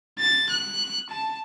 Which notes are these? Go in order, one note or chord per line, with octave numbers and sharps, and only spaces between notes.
A6
F#6
A5